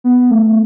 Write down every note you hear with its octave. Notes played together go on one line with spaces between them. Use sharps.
B3
A3